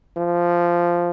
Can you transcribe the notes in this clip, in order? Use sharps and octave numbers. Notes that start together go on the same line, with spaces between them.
F3